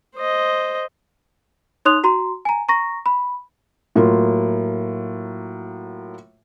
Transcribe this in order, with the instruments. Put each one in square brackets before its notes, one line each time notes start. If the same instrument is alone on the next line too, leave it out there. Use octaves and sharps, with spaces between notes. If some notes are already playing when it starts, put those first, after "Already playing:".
[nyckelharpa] C5 D#5
[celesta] D#4 C#5 C6 D#6 F#6 F7
F#4 A#5 C6
G#5 A#5
A#5 C#6 A#6
B5
[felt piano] A2 F#3 A#3 F4